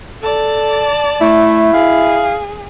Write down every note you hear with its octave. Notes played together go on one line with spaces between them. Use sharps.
A4 D5 A5
A3 E4
G#4 F5